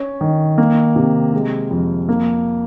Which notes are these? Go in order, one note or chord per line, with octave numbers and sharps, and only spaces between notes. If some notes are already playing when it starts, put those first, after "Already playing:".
Already playing: C#4
D#3
A#3
C3
G#3
F2
A#3